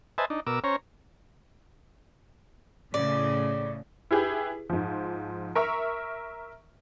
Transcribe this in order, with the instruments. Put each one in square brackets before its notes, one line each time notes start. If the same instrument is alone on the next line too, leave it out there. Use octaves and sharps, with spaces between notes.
[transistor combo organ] B4 C5 D#5 E5 G#5 A5
D4 D#4
B2 A#4 D6 E6
C#4 C5 C#5 A#5
[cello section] A2 C#3 [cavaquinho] D5
[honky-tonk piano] E4 G4 G#4 B4
G#2 F3
A#4 E5 C#6 F6